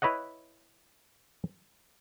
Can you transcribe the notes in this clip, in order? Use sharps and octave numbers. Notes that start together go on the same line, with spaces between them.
E4 B4 C#5 D#5 F#5